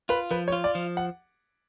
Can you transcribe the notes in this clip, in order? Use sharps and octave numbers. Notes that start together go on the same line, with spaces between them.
F4 B4
F3 B4
C#5
F4
D5
F3
F#5